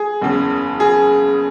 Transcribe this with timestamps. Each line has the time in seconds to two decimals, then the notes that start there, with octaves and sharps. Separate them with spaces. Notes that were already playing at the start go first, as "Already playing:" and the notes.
Already playing: G#4
0.21 F#1 E2 C#3
0.80 G#4